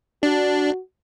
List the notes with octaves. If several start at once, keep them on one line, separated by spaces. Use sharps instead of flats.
D4 F#4